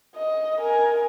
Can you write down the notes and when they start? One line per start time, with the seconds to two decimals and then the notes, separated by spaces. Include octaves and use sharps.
0.17 D#5
0.61 A#4 G#5